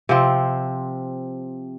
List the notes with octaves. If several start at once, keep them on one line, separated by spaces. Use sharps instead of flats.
C3 F3 C4